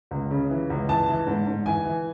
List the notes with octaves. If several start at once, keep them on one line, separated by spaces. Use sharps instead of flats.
C#2
C#3
E3
C#2
E3 A5
E3
G#2
G#2
E3 G#5
E3